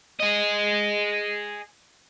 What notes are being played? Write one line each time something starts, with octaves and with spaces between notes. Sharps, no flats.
G#4 D#5